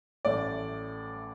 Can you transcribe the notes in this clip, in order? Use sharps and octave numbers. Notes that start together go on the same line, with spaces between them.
A1 A2 A3 D5